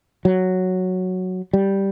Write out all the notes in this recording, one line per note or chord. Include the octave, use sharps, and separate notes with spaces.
F#3
G3